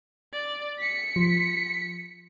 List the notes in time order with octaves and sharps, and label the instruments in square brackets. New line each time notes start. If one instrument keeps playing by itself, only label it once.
[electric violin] D5
B6 C#7
[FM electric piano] F3